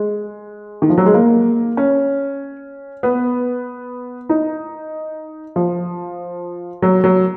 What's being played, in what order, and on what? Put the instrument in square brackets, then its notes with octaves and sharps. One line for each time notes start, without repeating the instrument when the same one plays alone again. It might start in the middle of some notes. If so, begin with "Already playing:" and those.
Already playing: [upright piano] G#3
D#3
F3
F#3
G#3
A#3
C#4
B3
D#4
F3
F#3
F#3